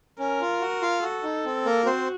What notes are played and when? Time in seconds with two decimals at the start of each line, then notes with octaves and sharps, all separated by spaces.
0.19 C#4 A#4
0.41 F4
0.61 F#4
0.82 F4 F5
1.03 F#4 A4
1.23 D#4
1.45 C4
1.65 A#3 A#4
1.86 C4 F#4 C5